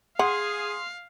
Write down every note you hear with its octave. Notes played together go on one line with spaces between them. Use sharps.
G#4 F5 F#5 C6